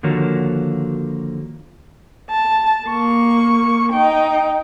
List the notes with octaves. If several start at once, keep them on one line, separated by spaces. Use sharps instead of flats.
D3 D#3 F3 A#3 F#4 C#5
A5
A#3 C#6
D#4 G5